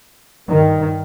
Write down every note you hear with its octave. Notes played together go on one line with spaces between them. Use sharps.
G2 D#3